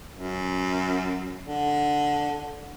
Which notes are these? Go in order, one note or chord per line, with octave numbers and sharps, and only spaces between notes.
F#2
D3